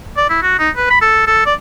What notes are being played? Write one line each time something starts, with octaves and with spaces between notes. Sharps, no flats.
D5
E4
F#4
D#4
B4
B5
A4
A4
D5